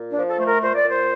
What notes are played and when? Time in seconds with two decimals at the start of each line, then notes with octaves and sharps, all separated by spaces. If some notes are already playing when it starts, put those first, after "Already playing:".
Already playing: A#2
0.10 D4
0.16 F3
0.28 A4
0.39 A3 C5
0.45 A#4
0.62 A#2 C5
0.75 D5
0.85 A#2 C5